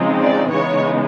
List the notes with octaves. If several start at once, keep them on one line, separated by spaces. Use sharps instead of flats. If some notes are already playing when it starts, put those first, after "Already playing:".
Already playing: C#3 F3 G#3 C4 D#4
D5
C#3 E3 G#3 B3 D#4 C#5